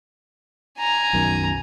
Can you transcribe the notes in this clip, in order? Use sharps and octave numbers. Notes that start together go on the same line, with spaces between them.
G#5 A#5
B1 F#2 D#3